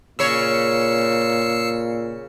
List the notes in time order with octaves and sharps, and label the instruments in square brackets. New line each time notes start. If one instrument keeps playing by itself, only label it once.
[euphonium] A#2 [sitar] C#3 C#5 [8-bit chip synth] E6 C7 C#7